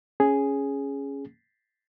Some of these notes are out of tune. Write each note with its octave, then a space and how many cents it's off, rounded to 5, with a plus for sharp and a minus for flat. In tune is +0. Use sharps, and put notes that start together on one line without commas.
C#4 +0 G#4 +0